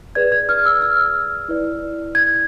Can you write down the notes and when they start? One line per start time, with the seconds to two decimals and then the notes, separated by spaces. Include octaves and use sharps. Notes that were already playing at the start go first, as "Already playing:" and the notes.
0.15 G#4 B4 D5 G#6
0.32 G#6
0.49 F6
0.66 E6
0.82 F6
1.49 E4 B4 D5
2.15 G#6